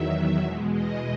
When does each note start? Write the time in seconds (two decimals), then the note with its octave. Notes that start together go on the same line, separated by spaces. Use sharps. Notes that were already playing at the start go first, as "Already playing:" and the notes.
Already playing: E2 D#3 F#3 E5
0.41 E2 B2 G#3
0.72 D#5